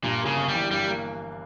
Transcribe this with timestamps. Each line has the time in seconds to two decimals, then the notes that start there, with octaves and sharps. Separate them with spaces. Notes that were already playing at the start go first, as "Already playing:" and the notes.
0.03 G2 A#2
0.20 A#3
0.26 C#3
0.37 G1
0.48 G3
0.54 E3
0.71 G2 G3
0.88 A#3